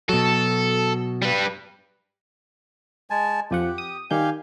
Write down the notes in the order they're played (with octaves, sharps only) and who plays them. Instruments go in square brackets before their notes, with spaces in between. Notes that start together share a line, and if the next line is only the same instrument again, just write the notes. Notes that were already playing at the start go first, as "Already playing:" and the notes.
[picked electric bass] B2 F#3 [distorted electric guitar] A4
[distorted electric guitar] G3 B4
[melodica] G#3 G#5 A5
[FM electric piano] F2 F3 F#5 [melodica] G4
[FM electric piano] D#6
[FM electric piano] D#3 G3 G6 [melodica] G4 F5 G#5